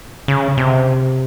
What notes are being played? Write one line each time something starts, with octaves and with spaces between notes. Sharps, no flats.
C#3
C3